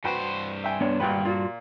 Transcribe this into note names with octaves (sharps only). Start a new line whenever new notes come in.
G2 F#4 B4 C5 G5
E5 G5 G#5
B3 D4 C#5
G#1 A#2 G3 B4 F#5 G5
A#2 F4 F#4